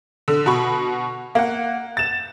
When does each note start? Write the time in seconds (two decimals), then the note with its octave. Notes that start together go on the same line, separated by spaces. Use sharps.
0.28 D3
0.46 B2 F#4 B5 C#6
1.35 A#3 F#5
1.97 A6 E7